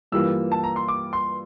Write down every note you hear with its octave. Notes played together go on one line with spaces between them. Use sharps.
G2 E3 G3 A#3 F4 E6
A5
A#5
C6
D6
C6